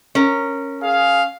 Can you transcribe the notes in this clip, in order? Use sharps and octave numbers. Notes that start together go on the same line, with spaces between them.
C#4 A#4
G#4 F5